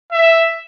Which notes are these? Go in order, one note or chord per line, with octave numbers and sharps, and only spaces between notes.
E5